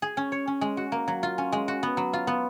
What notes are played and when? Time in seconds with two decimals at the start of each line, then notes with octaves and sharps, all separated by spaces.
0.02 G#4
0.17 C#4
0.32 C#5
0.47 C#4
0.61 G#3
0.77 F#4
0.92 A#3
1.08 F#3
1.23 F4
1.38 C#4
1.52 G#3
1.68 F#4
1.83 B3
1.97 F#3
2.13 F4
2.27 B3